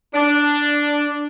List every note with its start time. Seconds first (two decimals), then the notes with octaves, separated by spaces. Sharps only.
0.14 D4